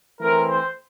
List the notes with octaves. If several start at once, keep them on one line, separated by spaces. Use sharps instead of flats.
E3 A3 C4 E4 A#4
C5